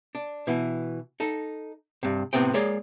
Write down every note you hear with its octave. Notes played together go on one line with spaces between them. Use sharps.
D4
B2 E3
D#4 A4
G2 C3
A2 C3 B3 C4 G5
G#3 A#3 G#4 C#5 D5